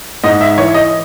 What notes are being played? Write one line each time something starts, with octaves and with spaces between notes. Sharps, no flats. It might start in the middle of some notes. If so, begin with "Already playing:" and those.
G#2 D#5
E5
E3 C#5
D#5